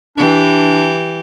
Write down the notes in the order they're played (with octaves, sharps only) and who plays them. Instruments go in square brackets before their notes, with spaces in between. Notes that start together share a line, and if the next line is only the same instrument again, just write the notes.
[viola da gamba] E3 G4 [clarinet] D4